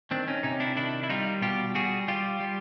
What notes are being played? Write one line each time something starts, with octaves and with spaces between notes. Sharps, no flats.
D#3 C4 D4
C#4 D#4
C3 C#4 D#4
D4 E4
D#3 D4 E4
E4
G3 D#4 F4
B2 F4 G4
G3 F#4 G#4
G3 F4 G4
G3